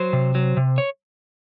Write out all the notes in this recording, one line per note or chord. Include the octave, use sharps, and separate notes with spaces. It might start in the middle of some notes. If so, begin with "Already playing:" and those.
Already playing: F#3 C5
C3
F#3
C3
C#5